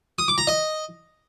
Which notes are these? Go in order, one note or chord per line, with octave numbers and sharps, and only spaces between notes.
D#6
D6
A#5
D#5